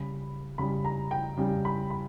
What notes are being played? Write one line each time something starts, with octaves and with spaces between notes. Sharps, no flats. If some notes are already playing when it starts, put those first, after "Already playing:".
Already playing: C#3 G3 B5
C#3 G3 B5
A#5
G5
C#3 G3
B5
B5